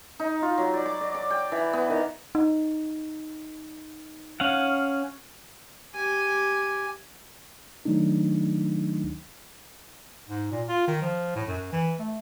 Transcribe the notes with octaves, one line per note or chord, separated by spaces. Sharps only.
D#4
F4
F#3
D5
D6
D5
D6
G5
E3
B3
D#3
D#4
C#4 F5 F#5
G4 G#5
D#3 F#3 A3 D4 D#4
G#2
A#2
F4
D#3
F3
A2
F#2
E3
A3